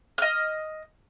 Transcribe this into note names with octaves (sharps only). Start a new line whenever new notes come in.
D#5 F6